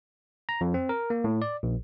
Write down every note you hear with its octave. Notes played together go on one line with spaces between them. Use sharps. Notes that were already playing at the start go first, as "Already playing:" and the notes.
A#5
F2
C4
A#4
A#3
A2
D5
A#1